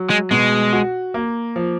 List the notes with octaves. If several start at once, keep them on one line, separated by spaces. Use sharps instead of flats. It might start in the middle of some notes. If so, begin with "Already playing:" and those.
Already playing: F#3
G#3
B2 G#3
F#4
A#3
F3